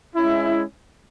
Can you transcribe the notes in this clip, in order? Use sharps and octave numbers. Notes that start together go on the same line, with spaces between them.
G#3 C#4 E4